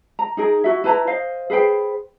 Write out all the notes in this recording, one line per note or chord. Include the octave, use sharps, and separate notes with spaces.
A#5
D#4 G#4 A#4
E4 F#4 E5
E4 B4 A5 A#5
C5 D#5 F5
G#4 B4 C5 G5